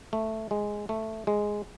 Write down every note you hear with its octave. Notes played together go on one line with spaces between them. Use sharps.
A3
G#3
A3
G#3